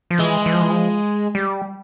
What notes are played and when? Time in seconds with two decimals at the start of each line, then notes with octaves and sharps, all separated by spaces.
0.10 F3
0.19 E3 G#3
0.46 E3
0.53 F3
0.61 E3
0.71 F3
1.35 G3